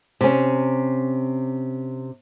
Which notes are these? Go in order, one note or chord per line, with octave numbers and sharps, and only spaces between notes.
C3 C#4